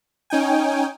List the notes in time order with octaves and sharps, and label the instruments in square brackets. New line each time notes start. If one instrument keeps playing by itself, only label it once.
[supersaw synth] C#4 D#4 G5 G#5